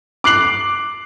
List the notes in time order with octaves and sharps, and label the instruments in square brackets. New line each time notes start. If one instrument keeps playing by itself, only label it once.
[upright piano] D6 F#6 C7 F#7